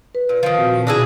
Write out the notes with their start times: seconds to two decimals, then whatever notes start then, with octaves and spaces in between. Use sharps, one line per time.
0.15 B4
0.29 A#2
0.43 D#3 F3
0.58 A#2 C4 F#4
0.87 B2 D4 E4 G#4 A#6